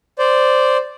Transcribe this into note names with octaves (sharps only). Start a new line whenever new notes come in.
C5 D5